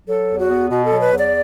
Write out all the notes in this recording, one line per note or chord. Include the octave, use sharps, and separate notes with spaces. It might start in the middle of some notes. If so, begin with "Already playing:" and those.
F#3 A4
E2
F#4
B3
B2 F#4
A4
F#3
B4
E2
D5